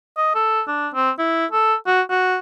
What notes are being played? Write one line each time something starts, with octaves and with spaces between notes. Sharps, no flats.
D#5
A4
D4
C4
E4
A4
F#4
F#4